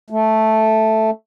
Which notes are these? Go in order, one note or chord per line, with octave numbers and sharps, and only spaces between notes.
A3